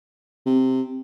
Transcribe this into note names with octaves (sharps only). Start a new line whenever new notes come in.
C3